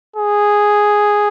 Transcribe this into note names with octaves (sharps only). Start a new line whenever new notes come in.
G#4